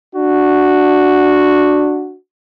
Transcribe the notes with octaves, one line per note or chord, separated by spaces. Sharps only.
D4 F#4